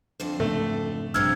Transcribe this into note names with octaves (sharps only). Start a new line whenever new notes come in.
F2 D3 C5
G#2 C#3 E3 A3
A#1 G2 C3 F3 E6 F6 G#6